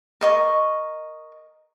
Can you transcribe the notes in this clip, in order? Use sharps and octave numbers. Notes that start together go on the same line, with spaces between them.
A#4 D#5 C#6